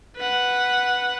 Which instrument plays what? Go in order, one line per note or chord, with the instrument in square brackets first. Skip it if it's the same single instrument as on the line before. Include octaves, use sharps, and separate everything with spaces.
[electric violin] B4 F#5